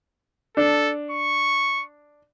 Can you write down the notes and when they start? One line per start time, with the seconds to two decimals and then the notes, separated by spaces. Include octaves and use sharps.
0.57 D4 A4
1.11 C#6